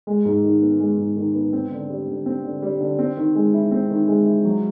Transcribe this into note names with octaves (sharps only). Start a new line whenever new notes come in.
G#3
G#2
D#3
B3
G#3
G#2
D#3
B3
C4
D3
G3
D3
C4
D3
G3
D3
C4
D#3
G#3
E4
C4
D#3
G#3
E4
F#3